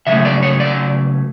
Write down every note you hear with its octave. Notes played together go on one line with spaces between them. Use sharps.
C#3 F#3 A3 E5
D5
C#5
D5